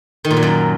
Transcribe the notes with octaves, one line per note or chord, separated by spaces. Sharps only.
D#3
A#2
F#3
F#2